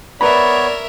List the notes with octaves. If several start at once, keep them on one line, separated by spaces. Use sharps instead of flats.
B3 A#4 B4 C#5 D5 E5 A#5 B5